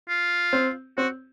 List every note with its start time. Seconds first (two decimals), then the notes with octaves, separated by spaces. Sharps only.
0.09 F4
0.53 C4
0.97 C4 F#4